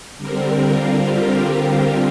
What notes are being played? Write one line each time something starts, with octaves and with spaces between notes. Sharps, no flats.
D3 G3 C4 A#4
F4
G4
G4